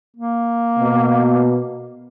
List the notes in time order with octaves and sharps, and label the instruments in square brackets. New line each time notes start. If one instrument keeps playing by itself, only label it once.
[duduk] A#3
[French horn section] B2